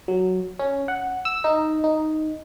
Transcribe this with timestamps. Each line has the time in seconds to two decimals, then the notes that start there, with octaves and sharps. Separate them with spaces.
0.08 F#3
0.59 C#4
0.88 F#5
1.25 E6
1.44 D#4
1.84 D#4